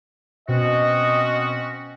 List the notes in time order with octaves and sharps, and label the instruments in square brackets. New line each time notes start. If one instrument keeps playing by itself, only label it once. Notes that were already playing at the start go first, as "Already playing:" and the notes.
[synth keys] B2 [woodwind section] C4 C#4 F#4 [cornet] D#5